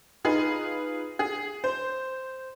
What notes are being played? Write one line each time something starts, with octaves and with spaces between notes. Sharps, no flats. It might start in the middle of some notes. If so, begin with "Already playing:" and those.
D#4 F4 G#4 B4
G#4
C5